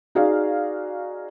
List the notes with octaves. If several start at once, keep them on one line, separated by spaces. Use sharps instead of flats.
D#4 F#4 G#4 D5 F5